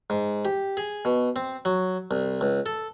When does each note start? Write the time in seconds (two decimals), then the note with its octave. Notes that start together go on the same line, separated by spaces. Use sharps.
0.10 G#2
0.45 G4
0.77 G#4
1.05 B2
1.36 C4
1.65 F#3
2.11 C2
2.41 C#2
2.66 A4